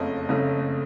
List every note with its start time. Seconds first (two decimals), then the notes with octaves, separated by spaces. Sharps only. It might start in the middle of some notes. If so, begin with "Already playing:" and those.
Already playing: F#1 F2 C#3 A3 D#5
0.29 F#1 F2 C#3 A3